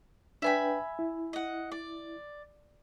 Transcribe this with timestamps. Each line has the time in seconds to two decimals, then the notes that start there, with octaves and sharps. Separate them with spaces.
0.42 D4 B4 E5 G5 G#5 B5
0.99 E4
1.33 D#5 F#5
1.72 D5